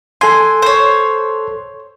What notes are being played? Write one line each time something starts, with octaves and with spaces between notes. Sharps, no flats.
A4 G#5 C6
C5 C#5